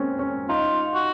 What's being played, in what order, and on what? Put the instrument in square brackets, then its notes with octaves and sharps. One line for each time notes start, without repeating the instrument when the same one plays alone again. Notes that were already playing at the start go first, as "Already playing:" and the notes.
Already playing: [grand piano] G#3 A#3 C4 C#4
C#4
[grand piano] D#4 [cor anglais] F4
[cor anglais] F#4